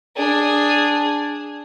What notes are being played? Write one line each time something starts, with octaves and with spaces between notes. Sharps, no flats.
D4 G#4